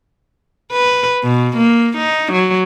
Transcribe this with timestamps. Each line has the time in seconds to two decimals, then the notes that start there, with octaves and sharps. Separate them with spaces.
0.72 B4
1.23 B2
1.58 A#3
1.98 D#4
2.33 F#3